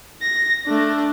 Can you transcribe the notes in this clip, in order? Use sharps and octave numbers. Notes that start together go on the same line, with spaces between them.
A#6
A3 D4